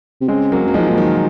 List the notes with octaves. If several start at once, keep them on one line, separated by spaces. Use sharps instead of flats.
C3
C#3 G#3 C4
F#3 A#3
F#2 A#3
G#2 F3 G#3
A#2
D#3 F#3